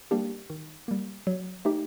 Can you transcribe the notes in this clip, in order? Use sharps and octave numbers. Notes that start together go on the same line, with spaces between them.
G3 A#3 D4 G4
D#3
G3 A#3
F#3
A3 D#4 G4